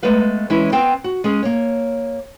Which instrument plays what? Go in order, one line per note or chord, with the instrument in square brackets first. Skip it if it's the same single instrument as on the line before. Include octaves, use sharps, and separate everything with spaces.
[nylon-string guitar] G#3 A3 B3 B4 F5
E3 G#3 C#4 E4
B3 C4 G5
F#4
G#3 C#4 G#4
A#3 C#5